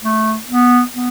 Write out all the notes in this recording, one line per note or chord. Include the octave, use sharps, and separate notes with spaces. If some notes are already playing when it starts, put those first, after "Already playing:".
A3
B3
B3